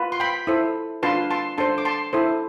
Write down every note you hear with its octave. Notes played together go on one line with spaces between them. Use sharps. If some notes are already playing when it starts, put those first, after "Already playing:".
Already playing: F4 B4
C6
G5 B5
E4 A4 C5
D4 F4 B4 A5 C6
A5 C6
D4 A4 C5 A5 C6
D6
A5 C6
E4 A4 C5